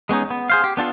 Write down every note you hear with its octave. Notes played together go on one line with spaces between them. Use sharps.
G#3 B3 C#4 D#4
B3
G#4 C5 F5
G4
B3 D4 F4 A4